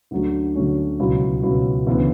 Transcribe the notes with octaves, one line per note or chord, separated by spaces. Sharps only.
D2 D3 F#3 A3 C#4
D2 D3 F#3 A3 C#4
C#2 B2 F#3 C#4 E4
C#2 B2 F#3 C#4 E4
D2 C#3 E3 B3